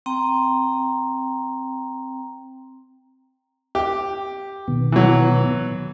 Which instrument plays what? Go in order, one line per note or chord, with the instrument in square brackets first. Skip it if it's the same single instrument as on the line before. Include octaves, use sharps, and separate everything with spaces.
[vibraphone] C4 G5 A#5
[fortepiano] G4
[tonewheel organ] B2 D#3 B3
[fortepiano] E3 F#3